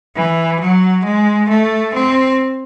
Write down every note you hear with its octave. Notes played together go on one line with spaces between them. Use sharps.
E3
F#3
G#3
A3
C4